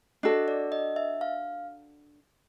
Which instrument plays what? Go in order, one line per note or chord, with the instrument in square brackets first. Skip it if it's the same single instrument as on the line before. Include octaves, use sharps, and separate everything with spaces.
[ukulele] D4 F#4 A4 [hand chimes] D#5
[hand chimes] D5
D#5
E5
F5